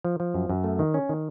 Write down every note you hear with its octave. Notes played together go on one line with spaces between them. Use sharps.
F3
F3
F#2
F#2
A3
D#3
C#4
D#3